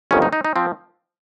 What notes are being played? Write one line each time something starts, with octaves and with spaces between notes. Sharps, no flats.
G1 F2 D#3 C#4
D#4
D#4
D#4
F3 C4